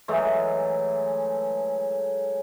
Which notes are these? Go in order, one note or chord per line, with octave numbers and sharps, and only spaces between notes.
E3 F#3 G#3 A3